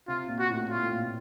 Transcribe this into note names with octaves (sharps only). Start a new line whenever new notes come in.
C3 F4
A#2
F#4
A2
A#2 F4
A2
A#2
B2